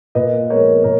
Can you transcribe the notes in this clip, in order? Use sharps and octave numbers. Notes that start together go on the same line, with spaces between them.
A#2 B4 D#5
F3 G#3 B3 A#4 C#5
A#2 A#4 C#5